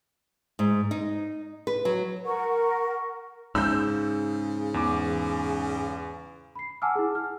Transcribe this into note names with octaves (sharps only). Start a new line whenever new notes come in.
G#2
D#4
B4
F#3
A#4 F#5 C#6
G#2 C#3 E6 G6
E2 D6
B5 C7
F#5 G#5 A5 D6 E6 F6
E4 G#4
F6